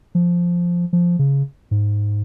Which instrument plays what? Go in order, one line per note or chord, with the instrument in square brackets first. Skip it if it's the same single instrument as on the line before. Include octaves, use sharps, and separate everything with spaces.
[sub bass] F3
F3
C#3
G#2